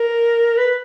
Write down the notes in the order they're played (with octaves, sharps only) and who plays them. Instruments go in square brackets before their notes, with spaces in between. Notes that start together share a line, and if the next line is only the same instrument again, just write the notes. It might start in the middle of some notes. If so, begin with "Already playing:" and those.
Already playing: [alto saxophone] A#4
B4